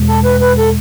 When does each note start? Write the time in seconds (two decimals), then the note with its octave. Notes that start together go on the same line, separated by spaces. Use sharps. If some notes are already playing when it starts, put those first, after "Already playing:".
Already playing: E2 B2 G#3
0.08 A4
0.25 B4
0.41 B4
0.58 A4